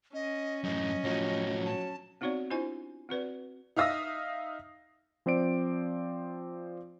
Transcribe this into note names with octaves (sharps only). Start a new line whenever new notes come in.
C#4 D#5
F#2 A2 D#5
A2 F3 F#3
A5
B3 C4 D#4 F#4 C#5 D5
D4 E4 F4 C5 D#5 G#5
C4 F#4 B4 D5
D#4 E5 F5 D#6 E6 A#6
F3 C4 C5 D5 D7